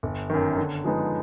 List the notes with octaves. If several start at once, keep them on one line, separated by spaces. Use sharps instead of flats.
G1
F#2 D#3
D3
F3 G#3 B3 D#4